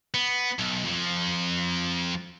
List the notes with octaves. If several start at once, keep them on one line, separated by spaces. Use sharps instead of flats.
B3
B1
F2 F3